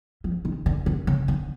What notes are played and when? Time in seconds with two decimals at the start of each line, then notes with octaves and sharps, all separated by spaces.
0.24 F3
0.45 D#3
0.66 D3
0.86 D3
1.07 C#3
1.28 D3